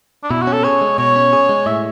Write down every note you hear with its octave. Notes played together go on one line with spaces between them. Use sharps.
D4
B2 E4
C#4 F#4
A4
G#4 C#5
G#3
B2 C#5
C#4
G#4
G#3
A2 E5